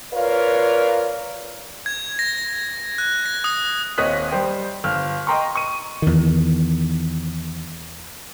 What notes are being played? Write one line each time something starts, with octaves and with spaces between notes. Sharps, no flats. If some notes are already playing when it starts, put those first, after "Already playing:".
F4 A#4 B4 C#5 D5 F5
G#6
A#6
F#6
A#6
D#6
D#1 C4 C#5 D#5 F#6 B6
G3 C5 G5
G1 F6
D#5 G5 A#5 C6 C#6
C#6 D#7
E2 D#3